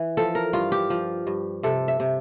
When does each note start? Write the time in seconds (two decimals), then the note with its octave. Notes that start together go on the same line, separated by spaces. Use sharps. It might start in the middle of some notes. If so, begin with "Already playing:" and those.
Already playing: E3
0.17 F3 A4
0.35 A#4
0.53 G2 F4
0.72 G4
0.90 F3
1.27 G2
1.63 C3 A4
1.88 E5
2.00 C3